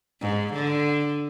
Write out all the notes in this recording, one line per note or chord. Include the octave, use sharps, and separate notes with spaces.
G#2
D3